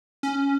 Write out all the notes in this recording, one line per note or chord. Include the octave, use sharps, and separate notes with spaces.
C#4